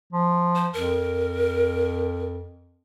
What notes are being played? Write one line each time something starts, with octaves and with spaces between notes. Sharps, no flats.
F3
C5
F2 A#4